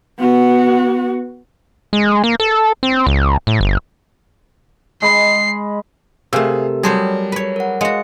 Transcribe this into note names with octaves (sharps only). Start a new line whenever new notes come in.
B3 F#4
G#3
A#3
A4
C4
C#2
A2
G1
G#3 B5 C7
C3 A3 G4 G#4 A#4 F5 E6
F#3 G3 G#4 C5 C#5 A5
B4 C#5
A#4 F#5
G#3 F#4 D#5 F5 C#7